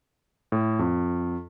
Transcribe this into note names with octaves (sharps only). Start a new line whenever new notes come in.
A2
F2